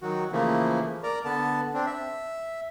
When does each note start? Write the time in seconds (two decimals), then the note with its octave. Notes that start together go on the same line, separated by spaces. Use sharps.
0.02 D#3 F#3 F#4
0.32 C#3 E3 F3 A3 A#3
1.03 A#4 D5 A#5
1.25 D3 B3 A5
1.74 C4 D4
1.86 E5